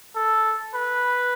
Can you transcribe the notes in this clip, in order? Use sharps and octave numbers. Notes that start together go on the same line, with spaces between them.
A4
B4